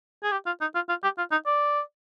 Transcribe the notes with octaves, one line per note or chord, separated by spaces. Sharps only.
G#4
G4
F4
D#4
F4
F4
G4
F4
D#4
D5